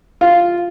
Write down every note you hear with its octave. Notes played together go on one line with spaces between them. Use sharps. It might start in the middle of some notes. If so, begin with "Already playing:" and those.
F4